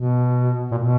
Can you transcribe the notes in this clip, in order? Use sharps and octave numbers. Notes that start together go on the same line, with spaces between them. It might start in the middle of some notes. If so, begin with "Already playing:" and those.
Already playing: B2
A#2
B2